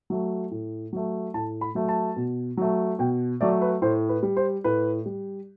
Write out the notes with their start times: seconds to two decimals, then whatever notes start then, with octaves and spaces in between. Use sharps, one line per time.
0.10 F#3 A3
0.51 A2
0.93 F#3 A3
1.34 A2 A5
1.61 B5
1.75 F#3 A3
1.89 A5
2.16 B2
2.57 F#3 A3
2.99 B2 G5
3.41 F#3 A3 D5
3.62 B4
3.82 A2 C5
4.09 B4
4.23 G3
4.37 C5
4.64 A2 B4
5.06 G3